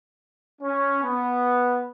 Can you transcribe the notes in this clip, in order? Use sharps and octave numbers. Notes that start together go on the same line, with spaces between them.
C#4
B3